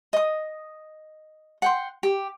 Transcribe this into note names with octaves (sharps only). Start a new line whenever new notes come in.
D#5 D#6
F#5 G5 C6
G4